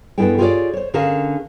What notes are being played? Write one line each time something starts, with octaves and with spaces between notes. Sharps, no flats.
G2 B3 E4 G#4 A4 G5
F4 G4 G#4 A#4 C#5 D5
C5 C#5
D3 C#4 G#4 A#4 F5 A5